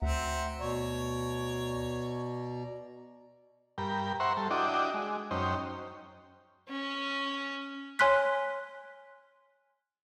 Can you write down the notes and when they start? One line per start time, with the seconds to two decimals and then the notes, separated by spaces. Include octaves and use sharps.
0.02 D2 C4 E5 F#5 A#5
0.60 B2 C#5 D5 A#5
3.78 G2 A#4 G5 B5
4.20 C5 E5 F#5 A#5 C6 C#6
4.37 G3 A4
4.51 D4 E4 F#4 D#5 G5 D6
4.94 G#3
5.31 F#2 C#4 D#4 C5 G5
6.69 C#4
7.99 C#5 G#5 C6 F6 F#6 B6